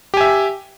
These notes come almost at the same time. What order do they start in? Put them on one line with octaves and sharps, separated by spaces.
G4 G#5 E5